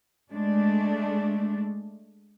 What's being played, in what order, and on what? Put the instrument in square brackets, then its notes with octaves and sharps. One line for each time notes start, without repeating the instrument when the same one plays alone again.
[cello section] G#3 A3 D4